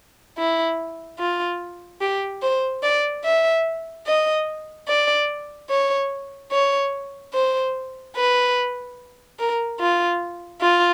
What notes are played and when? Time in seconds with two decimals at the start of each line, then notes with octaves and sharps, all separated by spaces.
0.38 E4
1.19 F4
2.01 G4
2.42 C5
2.83 D5
3.25 E5
4.07 D#5
4.88 D5
5.70 C#5
6.52 C#5
7.34 C5
8.16 B4
9.39 A#4
9.80 F4
10.61 F4